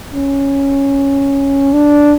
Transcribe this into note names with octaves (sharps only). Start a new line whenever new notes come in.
C#4
D4